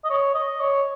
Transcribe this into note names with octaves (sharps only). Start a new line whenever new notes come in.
D#5
C#5
D#5
C#5